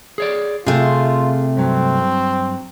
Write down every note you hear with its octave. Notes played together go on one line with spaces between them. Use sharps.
G#4 C#5 D5
C3 A3 F4 G#4
G2 F#3 C4